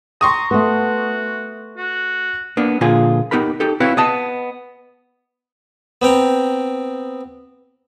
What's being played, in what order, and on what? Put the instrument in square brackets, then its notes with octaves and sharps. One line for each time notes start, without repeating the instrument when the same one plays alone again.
[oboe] A#5 [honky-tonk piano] C6 C#6 D#6
[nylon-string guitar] A3 B3 [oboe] F#4
[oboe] F#4
[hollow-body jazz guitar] A#3 B3 D4
A#2 D3 F3 A#3 F4 G#4
B3 D#4 G4 A#4 B5
D#4 G4 A4
C4 E4 F#4 B4 C#5 F5
B3 D#5 A5
[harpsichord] B3 C4 G5 A#5